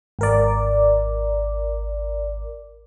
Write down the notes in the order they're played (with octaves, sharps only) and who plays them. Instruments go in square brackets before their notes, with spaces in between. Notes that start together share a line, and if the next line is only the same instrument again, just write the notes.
[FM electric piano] G#1 A#4 D5